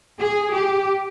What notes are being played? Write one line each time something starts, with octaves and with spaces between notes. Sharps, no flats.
G#4
G4